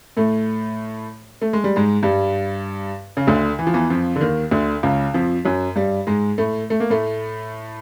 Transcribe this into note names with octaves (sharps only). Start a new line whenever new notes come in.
A2 A3
A3
G#3
G3
G#2 G#3
G2 G3
C#3
D2 D3
E3
F3
E2 E3
F2 F3
D3
D#2 D#3
D2 D3
C#2 C#3
F2 F3
F#2 F#3
G2 G3
G#2 G#3
A2 A3
A3
A#3
A2 A3